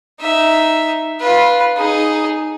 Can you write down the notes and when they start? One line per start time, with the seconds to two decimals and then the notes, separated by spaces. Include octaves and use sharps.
0.21 D#4 E5
1.20 F4 B4
1.77 D#4 G#4